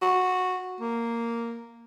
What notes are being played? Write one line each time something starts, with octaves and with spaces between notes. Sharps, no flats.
F#4
A#3